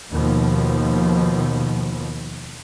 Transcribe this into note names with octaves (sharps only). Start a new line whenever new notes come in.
D#2 B2 F3